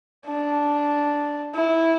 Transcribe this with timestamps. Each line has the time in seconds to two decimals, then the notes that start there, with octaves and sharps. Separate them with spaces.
0.26 D4
1.55 E4